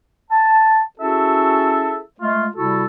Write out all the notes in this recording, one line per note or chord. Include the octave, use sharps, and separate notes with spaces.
A5
C#4 E4 F#4 G#4 A4 E5
G#3 A3 F4
C3 G3 E4 F#4 A4